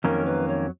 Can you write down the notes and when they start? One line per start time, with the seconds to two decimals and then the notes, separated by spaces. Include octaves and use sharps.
0.04 F2 D#3 F#3 A#3 C#4 A#4
0.25 B4
0.48 C#5